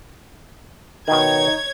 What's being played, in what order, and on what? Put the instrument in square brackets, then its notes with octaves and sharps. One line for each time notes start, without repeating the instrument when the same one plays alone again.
[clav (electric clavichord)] B2 D#3 [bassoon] D#4 [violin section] C#5 G#6